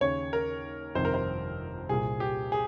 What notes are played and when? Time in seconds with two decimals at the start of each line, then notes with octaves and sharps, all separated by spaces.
0.01 D#2 C#3 C#5
0.33 A#4
0.95 G1 F2 C3 D#3 C5
1.05 A#4
1.14 C5
1.89 C2 A#2 G#4
2.20 G4
2.52 G#4